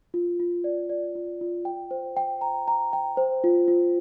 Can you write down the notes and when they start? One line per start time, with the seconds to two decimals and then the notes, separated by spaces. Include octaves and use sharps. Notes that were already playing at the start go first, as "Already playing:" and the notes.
0.14 F4
0.40 F4
0.64 D5
0.89 D5
1.15 F4
1.41 F4
1.65 G5
1.91 C5
2.17 G5
2.41 A#5
2.68 A#5
2.93 G5
3.17 C5
3.44 F4
3.68 F4